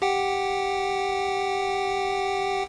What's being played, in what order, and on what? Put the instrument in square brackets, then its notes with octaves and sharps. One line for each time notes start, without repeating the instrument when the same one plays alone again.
[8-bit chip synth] G4 F#5 G5